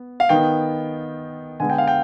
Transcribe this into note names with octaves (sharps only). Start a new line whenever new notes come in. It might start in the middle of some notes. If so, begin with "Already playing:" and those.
Already playing: B3
F5
D#3 B3 G5
D3 G#3 B3 G#5
G5
F5
G5